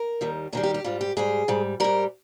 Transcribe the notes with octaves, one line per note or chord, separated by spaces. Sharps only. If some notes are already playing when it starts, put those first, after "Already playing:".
Already playing: A#4
D#2 D#3 G3
D#2 D#3 G3 G#4
G4
G4
G#2 G3 F4
G4
G#2 G3 G#4
G#2 G3
G#2 G3 A#4